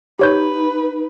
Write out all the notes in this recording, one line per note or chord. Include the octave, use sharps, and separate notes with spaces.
D#4 G4 B4 C#5 G6